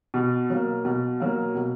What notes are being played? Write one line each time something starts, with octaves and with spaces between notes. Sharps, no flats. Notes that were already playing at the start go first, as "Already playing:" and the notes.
B2
F#3 A#3
B2
F#3 A#3
B2